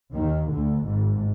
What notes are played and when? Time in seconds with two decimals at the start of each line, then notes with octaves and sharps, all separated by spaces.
0.13 D#2 D#3
0.50 D2 D3
0.87 G#1 G#2